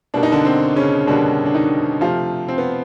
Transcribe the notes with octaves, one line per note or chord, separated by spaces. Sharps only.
B2 G3 A#3 D4
D#4
D3 D4
C4
C#3 C#4
B2 D3 G3 A#3 D4
D4
D#3 D#4
C3 F3 A3 F4
C4
B3